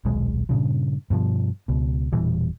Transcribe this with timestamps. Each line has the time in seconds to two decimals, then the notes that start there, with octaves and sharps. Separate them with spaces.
0.05 D#1 B1 G#3
0.49 G2 A#2 C#3 F3
1.10 G2 B2 F3
1.68 C#2 B2
2.12 E1 A#2 E3 G3